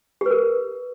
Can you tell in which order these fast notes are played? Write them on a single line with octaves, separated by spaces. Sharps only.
G4 B4 A#4